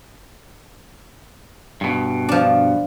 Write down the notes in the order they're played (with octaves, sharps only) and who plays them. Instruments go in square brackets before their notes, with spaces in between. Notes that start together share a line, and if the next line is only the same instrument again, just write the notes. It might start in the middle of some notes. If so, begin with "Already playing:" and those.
[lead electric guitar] G2 B2
[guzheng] F3 D4